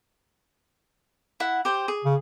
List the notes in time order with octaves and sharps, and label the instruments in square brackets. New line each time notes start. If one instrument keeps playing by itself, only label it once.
[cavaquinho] E4 F#5
G4 C5
G#4
[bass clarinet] C#3